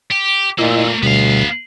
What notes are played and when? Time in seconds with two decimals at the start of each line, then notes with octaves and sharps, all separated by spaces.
0.11 G4
0.58 A#2 A3 A#3 E4 D#5 E6
1.03 D2 B2 G3 B3 F5